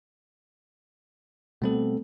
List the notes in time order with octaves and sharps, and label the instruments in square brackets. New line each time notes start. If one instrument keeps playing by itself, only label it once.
[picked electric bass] B2 G3 B3 [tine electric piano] A3 C4 A4